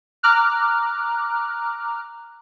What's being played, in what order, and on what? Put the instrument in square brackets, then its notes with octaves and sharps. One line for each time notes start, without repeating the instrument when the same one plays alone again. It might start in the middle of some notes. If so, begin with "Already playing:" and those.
[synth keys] A#5 D6 F6 F#6